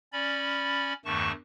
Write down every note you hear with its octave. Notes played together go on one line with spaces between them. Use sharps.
C#4 D5 B5
E2 G2 D#3 A3 A5 C#6